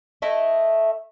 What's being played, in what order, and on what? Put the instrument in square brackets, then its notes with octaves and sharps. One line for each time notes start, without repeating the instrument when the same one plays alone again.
[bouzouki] A3 E4 D#5